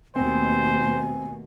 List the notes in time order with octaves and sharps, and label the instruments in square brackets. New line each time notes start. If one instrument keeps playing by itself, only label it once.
[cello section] D#2 B2 A3 [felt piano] C4 [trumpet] C5 [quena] G#5